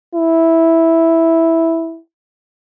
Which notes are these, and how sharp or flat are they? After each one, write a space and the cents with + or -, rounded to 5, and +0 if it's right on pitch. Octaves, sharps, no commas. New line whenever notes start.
E4 -5